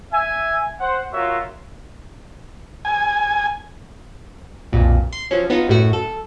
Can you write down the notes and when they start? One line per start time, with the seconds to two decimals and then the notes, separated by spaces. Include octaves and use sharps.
0.12 E5 G#5
0.80 C5 F#5
1.12 F4 F#4 A#4 C#5 E5
2.85 G#5
4.72 B1 F2 A#2
5.13 C6
5.31 F3 F#3 C#4
5.50 B3 D#4 F4
5.68 F#2 A2 A3 F#4
5.93 A4